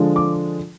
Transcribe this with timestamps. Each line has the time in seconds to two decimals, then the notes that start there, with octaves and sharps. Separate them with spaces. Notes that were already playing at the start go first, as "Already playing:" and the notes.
Already playing: D3 F3 G#3
0.16 D6